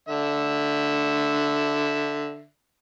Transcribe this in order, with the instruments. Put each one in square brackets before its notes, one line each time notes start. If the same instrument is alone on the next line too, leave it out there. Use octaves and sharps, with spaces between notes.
[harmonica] D3 E5